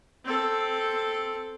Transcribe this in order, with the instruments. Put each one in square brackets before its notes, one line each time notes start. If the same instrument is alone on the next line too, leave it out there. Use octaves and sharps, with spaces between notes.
[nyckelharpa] C4 A4